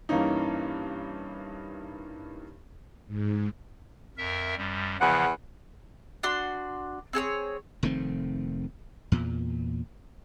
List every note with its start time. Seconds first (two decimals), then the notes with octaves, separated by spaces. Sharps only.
0.09 G2 E3 A#3 C#4 D#4
3.07 G#2
4.17 F2 A#4 E5
4.57 F#2 G3
5.00 E2 C#3 F3 F#5
6.23 D4 F#4 C6
7.13 C4 G#4 A4 C#5
7.83 F1 D#3 A3 C4
9.12 E2 A#2